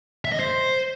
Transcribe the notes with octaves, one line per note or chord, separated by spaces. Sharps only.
E5
D#5
C5